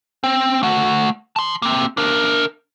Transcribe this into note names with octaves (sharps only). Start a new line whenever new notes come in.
C4
A3 F#5
A5 C6
A#3 C4
D4 A#4